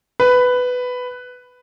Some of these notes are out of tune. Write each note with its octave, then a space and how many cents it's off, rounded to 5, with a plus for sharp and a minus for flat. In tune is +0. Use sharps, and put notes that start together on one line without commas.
B4 +10